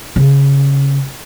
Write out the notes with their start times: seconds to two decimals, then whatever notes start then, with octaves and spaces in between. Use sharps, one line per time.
0.16 C#3